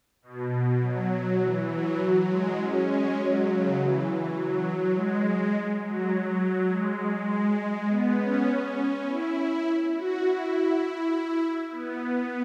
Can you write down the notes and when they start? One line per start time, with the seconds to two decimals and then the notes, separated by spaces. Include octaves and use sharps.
0.22 B2
0.81 F#3
1.40 E3
1.69 F#3
2.29 G#3
2.58 C#4
2.87 G#3
3.17 F#3
3.46 C#3
3.75 E3
4.05 E3
4.34 F#3
4.93 G#3
5.82 F#3
6.12 F#3
6.71 G#3
7.29 G#3
7.87 B3
8.18 C#4
8.76 C#4
9.06 E4
9.94 F#4
10.24 E4
10.83 E4
11.71 B3